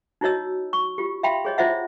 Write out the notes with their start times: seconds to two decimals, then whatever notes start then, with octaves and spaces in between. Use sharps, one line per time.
0.21 D#4 E4 F#4 C#5 D#5 E6
0.73 C#6
0.98 F4 G4
1.23 E5 F5 G5 B5 C6
1.45 G#4 C#5 D#5
1.58 E4 F4 C5 D#5 E5 F#5